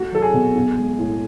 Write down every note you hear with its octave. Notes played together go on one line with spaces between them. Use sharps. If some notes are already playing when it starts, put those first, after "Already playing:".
Already playing: A3 F#4
F#3 A4
G#4
B2
B1
G#3
A2